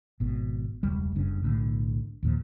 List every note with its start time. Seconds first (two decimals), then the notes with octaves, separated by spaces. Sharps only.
0.20 G#1 B2
0.83 E1 C#2 G3
1.16 F#1 G2 C#3 D4
1.43 B1 A2 D3
2.23 D#2 A#2 F3